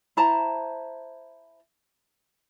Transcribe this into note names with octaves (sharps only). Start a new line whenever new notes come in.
E4 C5 A5 A#5